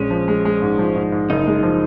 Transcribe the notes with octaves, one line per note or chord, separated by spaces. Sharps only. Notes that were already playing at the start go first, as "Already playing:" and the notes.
Already playing: A#1 G#3 C#4
F3
G#3
G#3
G#2
F3
G#2
G#2
F#1 D#4
G#3
F3